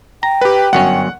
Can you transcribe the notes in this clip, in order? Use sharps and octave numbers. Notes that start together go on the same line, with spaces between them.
G5 A#5
G4 B4
G1 F#2 C#4 F#5